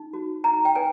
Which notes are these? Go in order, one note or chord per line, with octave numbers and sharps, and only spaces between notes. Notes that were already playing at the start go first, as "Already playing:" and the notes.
Already playing: D#4
F#4
D#4 A#5
G5
B4 G#5